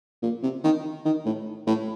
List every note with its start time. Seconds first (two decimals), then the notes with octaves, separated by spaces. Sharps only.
0.22 A#2
0.43 C3
0.64 D#3
1.05 D#3
1.25 A2
1.67 A2